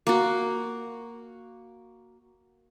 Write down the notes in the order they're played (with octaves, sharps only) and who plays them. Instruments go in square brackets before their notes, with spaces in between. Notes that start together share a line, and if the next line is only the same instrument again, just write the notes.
[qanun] A#3 F#4